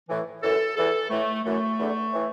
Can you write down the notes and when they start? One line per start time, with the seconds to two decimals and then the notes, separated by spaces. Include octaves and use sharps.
0.07 A2 E3
0.41 F#2 E3 A4
0.75 E2 E3 A4
1.09 A2 E3 A3
1.43 F#2 E3 A3
1.78 E2 D3
2.12 A2 E3